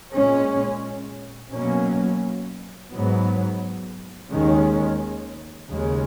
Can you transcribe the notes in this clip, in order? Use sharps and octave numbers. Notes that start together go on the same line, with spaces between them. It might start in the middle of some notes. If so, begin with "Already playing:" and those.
A#2 G#3 C#4
B2 F#3 A#3 C#4
G#2 F#3 B3
D#2 D#3 G#3 C#4
D#2 C#3 G#3